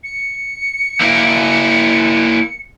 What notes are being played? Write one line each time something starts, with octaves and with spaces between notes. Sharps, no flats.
C#7
A#3 E4